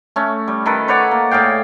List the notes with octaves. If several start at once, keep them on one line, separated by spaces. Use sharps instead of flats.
A3 C#4
G3
D#3 A4 B4
B4 C#5 D5 F#5
A#3
A2 G#4 F5 G5